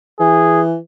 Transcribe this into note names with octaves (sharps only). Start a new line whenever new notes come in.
E3 G#4